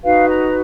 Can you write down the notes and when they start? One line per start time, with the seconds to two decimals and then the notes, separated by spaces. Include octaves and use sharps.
0.04 D#4 F#4 B4 F5
0.27 A#5